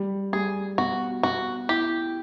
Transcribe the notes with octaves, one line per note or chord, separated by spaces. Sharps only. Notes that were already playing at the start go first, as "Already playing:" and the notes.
Already playing: G3
G3 G#4
B2 F#4
B2 F#4
E4 G4